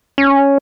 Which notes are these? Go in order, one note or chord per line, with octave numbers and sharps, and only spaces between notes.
C#4